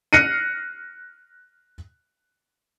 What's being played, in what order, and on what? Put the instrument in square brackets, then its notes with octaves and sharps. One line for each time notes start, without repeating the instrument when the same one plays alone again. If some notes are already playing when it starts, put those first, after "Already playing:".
[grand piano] F6 F#6 A#6 C7 C#7 D#7